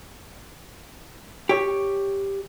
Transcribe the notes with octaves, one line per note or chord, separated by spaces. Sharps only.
G4 C#5